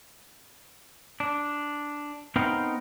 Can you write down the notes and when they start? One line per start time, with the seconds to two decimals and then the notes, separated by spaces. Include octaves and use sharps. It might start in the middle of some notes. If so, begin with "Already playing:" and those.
1.20 D4
2.36 B3 C4 D#4 A#4 F5 G5